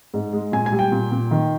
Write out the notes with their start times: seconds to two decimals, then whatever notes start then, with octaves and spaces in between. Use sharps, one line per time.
0.14 G#2
0.33 G#3
0.52 A#2 G#5
0.66 G#5
0.72 G3
0.79 G5
0.92 A#2
1.12 A#2
1.31 D#3